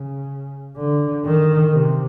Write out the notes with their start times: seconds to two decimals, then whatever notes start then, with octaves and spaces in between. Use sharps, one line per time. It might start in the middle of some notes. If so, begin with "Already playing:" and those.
Already playing: C#3
0.78 D3
1.25 D#3
1.73 C3